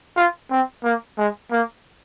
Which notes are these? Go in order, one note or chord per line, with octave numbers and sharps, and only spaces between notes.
F4
C4
A#3
G#3
A#3